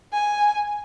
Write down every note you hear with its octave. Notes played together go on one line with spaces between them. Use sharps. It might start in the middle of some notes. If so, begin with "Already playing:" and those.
G#5